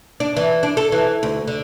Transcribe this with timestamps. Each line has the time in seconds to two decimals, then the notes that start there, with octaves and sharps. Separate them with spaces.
0.20 D4
0.36 E3
0.63 D4
0.77 A4
0.92 E3
1.23 D2
1.48 D3